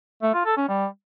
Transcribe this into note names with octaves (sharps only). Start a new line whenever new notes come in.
A3
F4
A4
C#4
G3